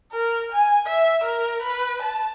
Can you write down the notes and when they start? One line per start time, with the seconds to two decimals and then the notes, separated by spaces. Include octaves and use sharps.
0.12 A#4
0.52 G#5
0.87 E5
1.24 A#4
1.62 B4
2.02 A5